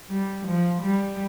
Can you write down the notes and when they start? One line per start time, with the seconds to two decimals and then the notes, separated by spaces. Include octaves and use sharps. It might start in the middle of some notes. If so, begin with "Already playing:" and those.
0.10 G3
0.49 F3
0.83 G3